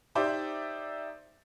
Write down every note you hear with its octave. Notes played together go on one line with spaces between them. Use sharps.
D#4 G4 C5 D5 E5